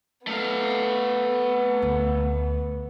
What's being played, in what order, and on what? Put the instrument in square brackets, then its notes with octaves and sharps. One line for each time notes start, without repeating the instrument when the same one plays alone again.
[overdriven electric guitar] A3 F5 [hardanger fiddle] B3
[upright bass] D2